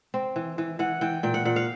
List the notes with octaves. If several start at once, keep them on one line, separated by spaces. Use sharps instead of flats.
C4
E3
E3
E3 F#5
E3 G5
A#2 G5
F#5
A#2 F#5
F5